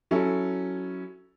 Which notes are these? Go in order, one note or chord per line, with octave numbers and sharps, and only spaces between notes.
F#3 C#4 E4 A4